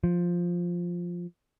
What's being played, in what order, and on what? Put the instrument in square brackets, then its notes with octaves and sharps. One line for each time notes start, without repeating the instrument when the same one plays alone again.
[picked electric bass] F3